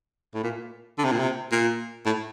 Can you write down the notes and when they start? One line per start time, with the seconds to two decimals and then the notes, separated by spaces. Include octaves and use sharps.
0.34 A2
0.44 A#2
0.98 D3
1.05 C3
1.12 A#2
1.19 C3
1.52 A#2
2.06 A2